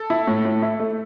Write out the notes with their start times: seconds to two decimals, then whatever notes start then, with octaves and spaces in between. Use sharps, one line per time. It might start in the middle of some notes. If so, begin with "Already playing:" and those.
Already playing: A4
0.10 E4
0.27 A2
0.45 A2
0.62 E4
0.80 A3